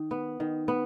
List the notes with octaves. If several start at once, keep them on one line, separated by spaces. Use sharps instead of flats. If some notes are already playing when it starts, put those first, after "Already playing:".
Already playing: D#3
B3
D#3
B3